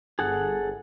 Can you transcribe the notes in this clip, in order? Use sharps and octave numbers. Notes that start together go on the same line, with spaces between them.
G1 G#4 A4 F#5